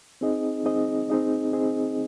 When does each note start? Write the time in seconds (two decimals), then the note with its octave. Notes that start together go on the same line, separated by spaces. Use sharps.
0.21 C4 D#4 G#4 D#5
0.65 C4 D#4 G#4 D#5
1.10 C4 D#4 G#4 D#5
1.53 C4 D#4 G#4 D#5